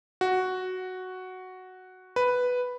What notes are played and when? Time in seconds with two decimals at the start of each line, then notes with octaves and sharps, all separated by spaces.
0.21 F#4
2.16 B4